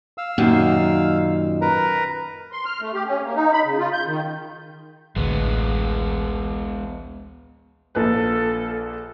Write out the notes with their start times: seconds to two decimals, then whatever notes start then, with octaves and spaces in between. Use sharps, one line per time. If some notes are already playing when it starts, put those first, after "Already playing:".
0.18 F5 E6
0.38 F#2 A#2 D#3
1.61 A#4 B4 A#5
2.52 C6
2.65 F6
2.81 A3
2.94 G4
3.06 C#4
3.22 A#3
3.35 D#4
3.53 B5
3.65 C#3
3.78 F4
3.93 G6
4.07 D#3
5.16 A1 D2 G#3 B3
7.95 A#1 A#3 A4 B4